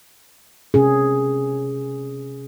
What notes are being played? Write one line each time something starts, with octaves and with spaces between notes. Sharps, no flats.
C3 C#4 G#4